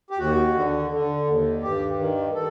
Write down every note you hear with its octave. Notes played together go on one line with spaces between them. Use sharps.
G4
D#2 F#4
D3
D3
D#2
G2 G4
D#3
D#3 A4